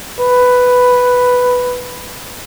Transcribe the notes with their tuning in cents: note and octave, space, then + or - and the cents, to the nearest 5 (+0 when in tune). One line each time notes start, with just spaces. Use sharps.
B4 +5